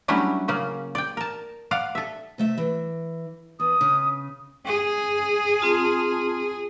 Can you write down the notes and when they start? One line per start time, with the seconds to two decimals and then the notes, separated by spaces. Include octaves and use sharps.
0.08 F#3 G3 A3 C#4 D4 E4
0.48 C#3 A#3 C#4
0.95 D5 G5
1.17 A#4 A5
1.71 D5 F5 F#5
1.95 A4 E5
2.38 C3 A3 E5
2.58 E3
3.60 E2 D#6
3.81 C#3
4.66 G#4
5.61 C4 F4 A5